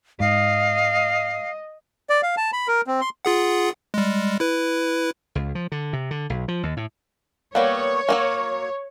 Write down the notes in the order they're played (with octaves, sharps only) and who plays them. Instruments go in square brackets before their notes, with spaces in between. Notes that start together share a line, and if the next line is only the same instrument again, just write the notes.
[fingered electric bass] G#2 [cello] D#5 [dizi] F5
[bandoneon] D5
F5
A5
B5
A#4
C4
C6
[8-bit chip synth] F4 G#4 F#5
G3 G#3
E4 B4
[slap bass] C#2
F3
D3
C3
D3
B1
F3
D#2
A2
[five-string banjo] G3 A#3 B3 [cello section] C#5
[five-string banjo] F#3 A3 A#3